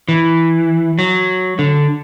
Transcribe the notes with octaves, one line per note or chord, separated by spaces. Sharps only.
E3
F#3
D3